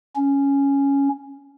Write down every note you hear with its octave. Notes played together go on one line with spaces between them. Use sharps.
C#4